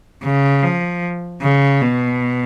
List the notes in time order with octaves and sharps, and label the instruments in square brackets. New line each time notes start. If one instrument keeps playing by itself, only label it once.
[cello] C#3
F3
C#3
B2